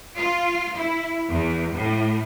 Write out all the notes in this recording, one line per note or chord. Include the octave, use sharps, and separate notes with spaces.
F4
E4
E2
A2